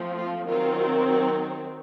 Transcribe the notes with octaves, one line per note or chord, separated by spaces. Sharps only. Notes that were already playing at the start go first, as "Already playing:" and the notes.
Already playing: F3 A3 C4
F4
D#3 F#3 C4 F4